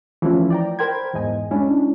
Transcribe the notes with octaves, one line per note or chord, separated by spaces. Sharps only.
E3 F3 A3 C#4 E4 F4
D5 G5 A#5
A#4 C5 G5 B5 G#6
E2 G#2 D#5 G#5
G#3 C#4 D4 E4